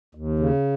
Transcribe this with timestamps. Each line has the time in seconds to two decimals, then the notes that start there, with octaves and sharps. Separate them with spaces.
0.15 D#2
0.39 C#3